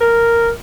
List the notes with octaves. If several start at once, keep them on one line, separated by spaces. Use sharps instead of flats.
A#4